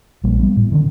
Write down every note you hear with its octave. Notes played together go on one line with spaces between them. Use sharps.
A#1 G3 A#3
G3 A3 B3
A2
D3 D#3 C#4